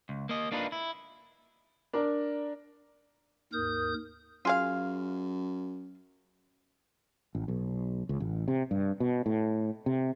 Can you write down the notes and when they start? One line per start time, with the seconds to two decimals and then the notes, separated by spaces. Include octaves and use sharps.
0.09 C#2
0.29 A#3 D#5
0.51 A#3 D4 D#4 F4 B4
0.72 E4
1.93 D4 A#4 D5
3.53 D#2 G#2 A#4 D#6 G6
4.45 F#2 F4 G#4 F5
7.35 A1
7.48 B1
8.09 C#2
8.20 A1
8.48 C3
8.71 G2
9.00 B2
9.26 A2
9.86 C3